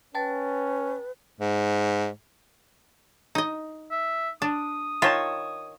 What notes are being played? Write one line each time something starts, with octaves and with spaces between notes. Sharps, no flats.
C#4 B4 G5 A5 A6
G#2
D#4 D#5
E5
D4 D#6
D#3 F4 C#5 A5